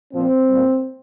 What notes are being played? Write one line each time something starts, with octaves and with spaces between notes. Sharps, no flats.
A#2 F3 C4
A#2 G3